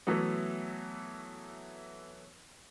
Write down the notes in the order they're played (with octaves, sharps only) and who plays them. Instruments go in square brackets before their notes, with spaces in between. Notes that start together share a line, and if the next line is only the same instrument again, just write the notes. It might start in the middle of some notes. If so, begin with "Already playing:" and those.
[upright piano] E3 F#3 A3 B3